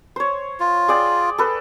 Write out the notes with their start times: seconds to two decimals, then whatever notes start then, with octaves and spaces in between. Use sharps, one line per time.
0.16 C5 C#5
0.60 F4
0.88 G#4 D5 G5
1.38 A4 B4